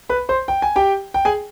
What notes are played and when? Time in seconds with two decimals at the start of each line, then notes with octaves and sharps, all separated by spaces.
0.10 B4 B5
0.29 C5 C6
0.48 G5
0.62 G#5
0.76 G4 G5
1.14 G5
1.25 G#4 G#5